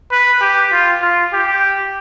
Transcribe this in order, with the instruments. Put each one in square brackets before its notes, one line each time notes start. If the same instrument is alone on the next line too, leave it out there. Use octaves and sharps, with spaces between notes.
[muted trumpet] B4
G4
F4
F4
G4